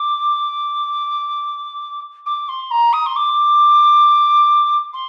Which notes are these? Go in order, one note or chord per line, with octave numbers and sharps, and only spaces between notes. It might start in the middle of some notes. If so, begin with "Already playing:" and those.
Already playing: D6
D6
C6
A#5
D#6
C6
D6
C6